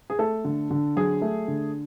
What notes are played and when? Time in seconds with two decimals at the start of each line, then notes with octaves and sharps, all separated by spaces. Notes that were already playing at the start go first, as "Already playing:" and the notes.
0.10 G#4
0.19 A3 A4
0.45 D3
0.70 D3
0.96 F#3 G#4
1.22 A3
1.48 D3